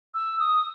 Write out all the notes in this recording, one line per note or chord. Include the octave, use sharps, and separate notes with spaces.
E6
D#6